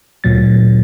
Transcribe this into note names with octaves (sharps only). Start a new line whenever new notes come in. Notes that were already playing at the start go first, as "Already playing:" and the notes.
D2 A#2 F#3 A6